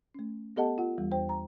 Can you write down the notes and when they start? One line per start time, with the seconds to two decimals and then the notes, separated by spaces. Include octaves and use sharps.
0.15 A3 C#4
0.56 B3 G4 A4 D#5 F#5 A5
0.78 F4 F#5
0.98 E2 E3 G3
1.11 E2 C5 G5
1.29 A#5